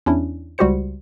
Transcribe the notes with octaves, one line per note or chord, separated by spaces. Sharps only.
E2 C#4 D4 E4
C#2 G3 F#4 G4 C5 C#7